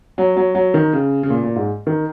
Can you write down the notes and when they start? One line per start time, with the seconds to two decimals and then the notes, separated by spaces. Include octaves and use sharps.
0.18 F#3
0.37 F#3
0.55 F#3
0.74 D#3
0.93 C#3
1.23 C#3
1.30 A#2
1.43 A#2
1.56 G#2
1.87 D#3